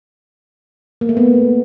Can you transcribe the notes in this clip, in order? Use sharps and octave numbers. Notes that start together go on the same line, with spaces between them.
A#3
A3
B3